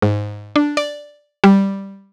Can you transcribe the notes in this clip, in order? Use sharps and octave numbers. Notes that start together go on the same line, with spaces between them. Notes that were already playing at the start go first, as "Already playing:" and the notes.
G#2
D4
D5
G3